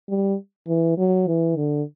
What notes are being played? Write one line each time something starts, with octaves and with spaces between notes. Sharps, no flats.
G3
E3
F#3
E3
D3